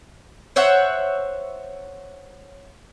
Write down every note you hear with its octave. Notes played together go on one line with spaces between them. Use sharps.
C5 C#5 E5 F#5